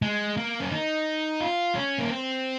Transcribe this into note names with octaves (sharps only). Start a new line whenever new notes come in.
G#3
A#3
C#4
D#4
F4
C#4
A#3
C4